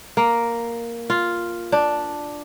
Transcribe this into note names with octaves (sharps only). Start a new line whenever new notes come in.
A#3
F4
D4